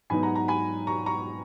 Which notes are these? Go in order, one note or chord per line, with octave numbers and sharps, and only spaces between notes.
G#2 F#3 B3 D#4 G#5 B5
F#5 A#5
F#5 A#5
G#5 B5
A#5 C#6
A#5 C#6